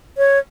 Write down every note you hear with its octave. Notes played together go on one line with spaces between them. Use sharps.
C#5